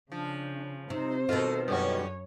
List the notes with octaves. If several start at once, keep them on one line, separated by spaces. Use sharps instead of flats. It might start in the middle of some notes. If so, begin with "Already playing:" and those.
C#3 F3 D4
C3 D#4 C5
B2 D#3 F4 A4
F#2 D3 G3 C#4 F#4 C#5